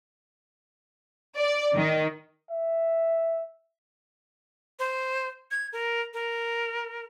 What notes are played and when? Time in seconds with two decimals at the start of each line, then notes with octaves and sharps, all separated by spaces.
1.37 D5
1.76 D#3
2.51 E5
4.79 C5
5.51 G#6
5.73 A#4
6.14 A#4